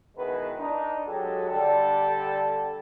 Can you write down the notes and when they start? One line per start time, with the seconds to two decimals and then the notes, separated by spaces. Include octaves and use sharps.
0.17 B2 D#3 G#3 B3 E4 B4
0.58 D4 D#4
1.07 F#3 G#3 F#4 G4 A4
1.50 D3 G3 A4